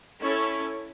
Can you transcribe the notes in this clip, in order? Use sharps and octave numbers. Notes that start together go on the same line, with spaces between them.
C#4 E4 A4 C#5